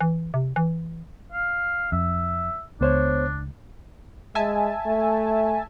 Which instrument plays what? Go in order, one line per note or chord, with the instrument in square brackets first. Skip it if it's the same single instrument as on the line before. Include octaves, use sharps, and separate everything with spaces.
[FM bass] E3
C3
E3
[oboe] F5
[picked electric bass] F2 [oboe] E5
[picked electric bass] C#2 [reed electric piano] B3 C5 C#5 [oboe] D4
[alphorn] G#3 [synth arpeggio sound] E5 G#5 A5
[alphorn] A3